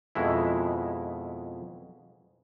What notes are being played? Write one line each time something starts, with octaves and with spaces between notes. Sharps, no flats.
F2 B2 G#3 E4